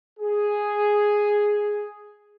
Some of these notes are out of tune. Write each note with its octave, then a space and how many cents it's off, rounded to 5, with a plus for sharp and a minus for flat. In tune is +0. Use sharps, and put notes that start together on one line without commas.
G#4 +0